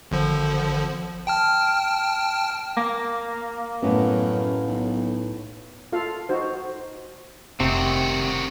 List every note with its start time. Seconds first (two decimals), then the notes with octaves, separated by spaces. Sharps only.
0.11 G#1 D3 F3
1.27 G5 A5 F6
2.77 A#3
3.82 F#2 A2 B3
4.68 B1
5.92 F4 A4 F5
6.29 D#4 F#4 C5
7.60 F1 C3 D#3 C4 F#4